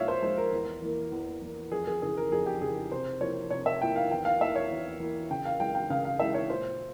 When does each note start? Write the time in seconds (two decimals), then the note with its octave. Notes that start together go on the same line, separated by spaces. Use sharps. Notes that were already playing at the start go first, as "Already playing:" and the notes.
Already playing: A#2 F3 G#3 C#5 E5 F5
0.08 C5
0.22 F3 G#3 C5
0.37 A#4
0.52 E2
0.82 E3 A#3
1.12 E2
1.42 E3 A#3
1.72 F2 G#4
1.87 G#4
2.02 C#3 E3 G#4
2.17 A#4
2.31 F2 G#4
2.46 G4
2.61 C#3 E3 G#4
2.92 C3 C5
3.21 F3 A#3 E4 C#5
3.50 C3 C#5
3.66 E5
3.81 F3 A#3 E4 G5
3.96 F5
4.11 E2 G5
4.25 F5
4.41 E3 A#3 E5
4.56 C#5
4.70 E2
5.00 E3 A#3
5.30 C#3 G5
5.45 F5
5.60 E3 G#3 E4 G5
5.75 G5
5.90 C#3 F5
6.05 F5
6.19 E3 G#3 E4 E5
6.34 C#5
6.50 A#2 C5